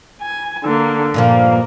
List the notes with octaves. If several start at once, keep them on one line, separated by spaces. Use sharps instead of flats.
G#5
D3 A#3
G2 A#2 F3 A#3 F5